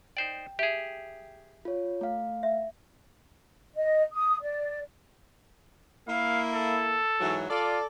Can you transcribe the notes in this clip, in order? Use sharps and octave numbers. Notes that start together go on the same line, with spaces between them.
D#4 C5 D5 G5
G4 G#4 E5
F4 C#5
A3 F5
E5
D#5
D#6
D5
A#3 E4 F5
A4
G#2 E3 F#3
F4 A4 D5